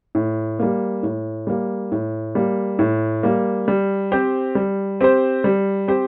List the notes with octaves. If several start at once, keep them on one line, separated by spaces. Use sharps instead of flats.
A2
G3 A#3
A2
G3 A#3
A2
G3 A#3
A2
G3 A#3
G3
C4 G4 C5
G3
C4 G4 C5
G3
C4 G4 C5